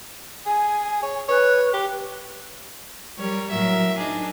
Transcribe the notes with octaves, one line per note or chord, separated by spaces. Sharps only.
G#4 G#5
C#5
B4 C#5
G4
G3 A#4 C#5
A2 F#3 A#4 E5
D4 D#4 G#4